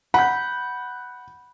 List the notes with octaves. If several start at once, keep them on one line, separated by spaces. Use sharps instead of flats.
F#5 B5 G6